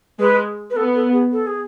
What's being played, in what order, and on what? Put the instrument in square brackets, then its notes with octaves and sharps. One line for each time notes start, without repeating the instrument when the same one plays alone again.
[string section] G#3 [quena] B4
[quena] B4
[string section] B3 [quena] A4
[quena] A4
G#4
A4
G#4